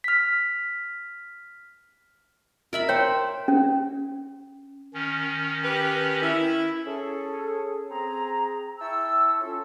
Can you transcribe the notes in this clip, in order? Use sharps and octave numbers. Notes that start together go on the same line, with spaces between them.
F6 B6
A#4 E5 B5
C5 C#5 G5
C#4
D#3 C#4
G4 B4
E4
C#4 G#4 A4
C4 G#4 A#5
E4 G5 A5 C#6 E6
C#4 F4 A4